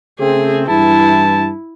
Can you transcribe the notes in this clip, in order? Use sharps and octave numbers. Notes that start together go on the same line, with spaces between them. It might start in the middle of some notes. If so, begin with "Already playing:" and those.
C#3 A3 C4 G#4
G2 E3 E4 A5